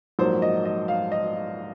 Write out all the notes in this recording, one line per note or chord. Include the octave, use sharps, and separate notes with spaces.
A#1 G#2 F#3 A#3 C5
D#5
D#5
F5
D#5